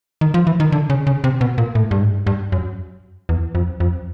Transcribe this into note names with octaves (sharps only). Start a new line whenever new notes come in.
D#3
F3
E3
D#3
D3
C#3
C#3
C3
B2
A#2
A2
G2
G#2
G2
F#2
E2
F2
F2